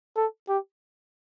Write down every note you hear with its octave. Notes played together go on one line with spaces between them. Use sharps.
A4
G4